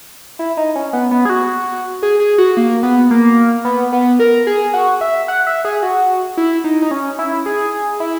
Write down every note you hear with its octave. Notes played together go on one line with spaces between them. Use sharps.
E4
D#4
C#4
B3
B3
G#4
F#4
G#4
G#4
F#4
A#3
B3
A#3
B3
B3
A#4
G#4
F#4
E5
F#5
E5
G#4
F#4
E4
D#4
D#4
C#4
E4
G#4
E4